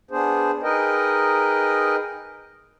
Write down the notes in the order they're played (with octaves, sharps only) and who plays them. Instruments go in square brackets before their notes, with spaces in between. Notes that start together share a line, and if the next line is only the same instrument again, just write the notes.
[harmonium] B3 D4 G#4 C5
D#4 G#4 A#4 B4 D#5 G5